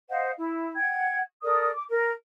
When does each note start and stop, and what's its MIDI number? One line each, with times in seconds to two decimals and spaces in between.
0.09 0.31 72
0.09 0.31 75
0.09 0.31 77
0.09 0.31 78
0.37 0.75 64
0.75 1.19 78
0.75 1.19 79
0.75 1.19 92
1.43 1.70 69
1.43 1.70 70
1.43 1.70 74
1.43 1.70 87
1.74 1.84 86
1.89 2.11 70